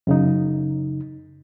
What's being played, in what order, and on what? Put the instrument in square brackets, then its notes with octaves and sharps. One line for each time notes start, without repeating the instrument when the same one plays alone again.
[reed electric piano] F#2 C#3 D#4